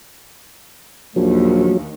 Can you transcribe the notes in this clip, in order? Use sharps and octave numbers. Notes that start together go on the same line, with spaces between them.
A#1 D#2 F#3